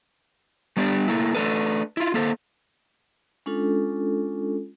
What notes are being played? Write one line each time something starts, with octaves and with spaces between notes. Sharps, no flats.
G3 B3 D4 G4
A3 A#3 E4
A3 D4 A4 B4
E4 F4
A#3 A4 C5
G#3 C#4 D4 F4 A4